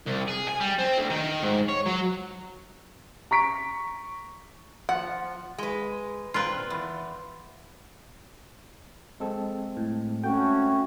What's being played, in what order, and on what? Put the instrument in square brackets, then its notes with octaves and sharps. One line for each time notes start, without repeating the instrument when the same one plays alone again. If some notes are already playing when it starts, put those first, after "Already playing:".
[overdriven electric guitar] C2
G#4
G#5
G3
C4
D2
D#3
G#2
C#5
F#3
[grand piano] A#5 C#6 B6 D7
[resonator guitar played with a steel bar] F3 [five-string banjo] F#5
[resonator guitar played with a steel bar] G#3 B4
[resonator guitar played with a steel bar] A#2 C4 [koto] F4 B4
[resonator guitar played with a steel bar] E2
[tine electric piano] G#3 C4 A4
[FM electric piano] A2
[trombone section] A3 F#4 [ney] C#4 [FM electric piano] G5